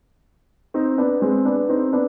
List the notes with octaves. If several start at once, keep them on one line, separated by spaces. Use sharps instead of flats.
C4 D#4
B3 D4
G#3 C4
B3 D4
C4 D#4
B3 D4